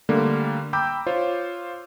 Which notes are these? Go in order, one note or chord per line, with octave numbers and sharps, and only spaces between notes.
D3 G3 A3 A#3
G5 A#5 B5 D6 E6 G6
F4 C5 C#5